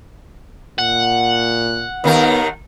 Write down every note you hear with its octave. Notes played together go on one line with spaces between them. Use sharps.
A#2 F#5
D#2 D#3 B3 A#4